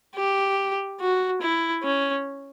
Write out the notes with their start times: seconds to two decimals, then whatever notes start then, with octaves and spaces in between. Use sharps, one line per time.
0.15 G4
1.00 F#4
1.41 E4
1.83 C#4